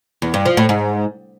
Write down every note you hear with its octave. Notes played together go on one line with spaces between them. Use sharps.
E2
G2
F3
A2
G#2